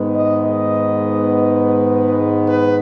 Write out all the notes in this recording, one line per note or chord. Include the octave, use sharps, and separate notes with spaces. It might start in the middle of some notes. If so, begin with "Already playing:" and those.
Already playing: G#2 D#3 G#3 B3
D#5
D#5
B4